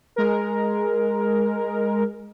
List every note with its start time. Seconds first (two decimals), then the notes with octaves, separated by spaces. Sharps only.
0.16 G#3 A#4